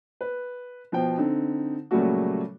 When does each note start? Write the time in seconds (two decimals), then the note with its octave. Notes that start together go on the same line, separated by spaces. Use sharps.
0.21 B4
0.92 B2 F3 C5 G5
1.18 D3 C4 D#4
1.91 A#2 C#3 F#3 G3 A3 F#4